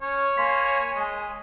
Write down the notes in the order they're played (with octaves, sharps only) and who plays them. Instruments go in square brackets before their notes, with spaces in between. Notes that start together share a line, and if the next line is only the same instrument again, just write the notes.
[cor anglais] C#4 [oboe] C#5
[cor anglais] A#3 [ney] G#5 [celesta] C6 B6
[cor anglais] G#3